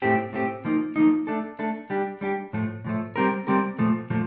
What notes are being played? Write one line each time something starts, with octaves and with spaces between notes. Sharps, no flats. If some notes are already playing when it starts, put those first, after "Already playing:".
A2 A3 C4 G4
A2 A3 C4 G4
F3 A#3 D#4
F3 A#3 D#4
A3 D4 A4
A3 D4 A4
G3 D4 G4
G3 D4 G4
A2 F3 A3
A2 F3 A3
G3 C4 G4 A#4
G3 C4 G4 A#4
A#2 F3 A3
A#2 F3 A3